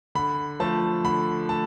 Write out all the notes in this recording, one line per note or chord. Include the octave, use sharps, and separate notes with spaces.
D3 B5
F3 A3 A5
D3 B5
A3 A5